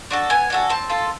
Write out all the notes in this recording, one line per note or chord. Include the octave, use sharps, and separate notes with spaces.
D4 F#4 A4
B3 G#5
D4 F#4 A4
C4 A5
F4 A4